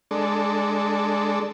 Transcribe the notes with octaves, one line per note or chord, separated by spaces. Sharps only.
G#3 D4 A4